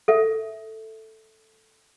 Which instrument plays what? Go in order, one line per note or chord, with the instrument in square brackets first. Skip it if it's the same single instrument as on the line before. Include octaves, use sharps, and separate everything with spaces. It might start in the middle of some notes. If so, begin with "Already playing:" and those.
[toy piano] A4 E5